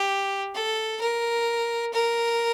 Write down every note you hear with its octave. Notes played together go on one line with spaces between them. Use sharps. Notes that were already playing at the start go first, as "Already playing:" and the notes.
Already playing: G4
A4
A#4
A#4